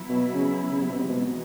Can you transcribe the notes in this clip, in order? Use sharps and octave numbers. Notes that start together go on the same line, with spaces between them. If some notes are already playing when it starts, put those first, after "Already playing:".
Already playing: F#3 B3 E4
B2
C#3
C#3
C3
B2
C3
B2 E3 G#3 B3 D#4 F#4